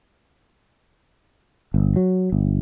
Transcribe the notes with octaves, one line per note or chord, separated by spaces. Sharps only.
G1
F#3
G1